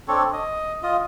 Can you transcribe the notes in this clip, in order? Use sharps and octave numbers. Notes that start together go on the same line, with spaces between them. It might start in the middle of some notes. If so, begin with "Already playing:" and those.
C4 D4 A4 C#5
D#5
F4 D#5